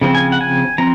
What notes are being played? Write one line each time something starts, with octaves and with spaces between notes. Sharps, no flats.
C#3 F3 C4
G#5
F#5
G#5
F3 C4 A#5